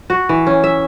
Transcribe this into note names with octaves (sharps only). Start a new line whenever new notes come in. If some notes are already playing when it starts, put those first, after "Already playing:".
F#4
E3
C#4
E5